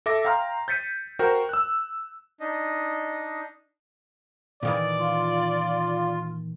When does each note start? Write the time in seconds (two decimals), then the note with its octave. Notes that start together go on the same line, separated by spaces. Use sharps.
0.06 A4 E5 D6 A#6
0.25 F5 G5 A#5 C6 F6
0.68 G6 A6 B6 C#7 D#7
1.19 F#4 A#4 C5 G5
1.49 E6 F#6
2.40 D4 D#4 D#5
4.63 A#2 D#3 E3 D5
4.99 F4